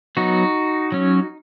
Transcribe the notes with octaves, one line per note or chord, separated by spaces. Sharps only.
F#3 B3 D#4 F#4
F#3 C#4